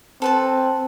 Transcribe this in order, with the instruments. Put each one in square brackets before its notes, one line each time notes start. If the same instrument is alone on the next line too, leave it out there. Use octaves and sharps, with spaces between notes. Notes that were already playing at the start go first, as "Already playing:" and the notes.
[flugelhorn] C4 [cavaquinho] A4 B4 A5